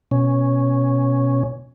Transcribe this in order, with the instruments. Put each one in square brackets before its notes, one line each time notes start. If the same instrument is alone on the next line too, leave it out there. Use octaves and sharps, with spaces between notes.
[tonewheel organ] B2 C#4